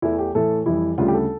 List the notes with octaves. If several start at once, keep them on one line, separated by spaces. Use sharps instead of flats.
E2 E3 A3 E4
G4
A2 E3 A3 A4
F2 E3 G3 E4
D2 C#3 G3 F4
G4
A4